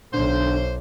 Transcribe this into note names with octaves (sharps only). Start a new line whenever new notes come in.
B1 D3 C5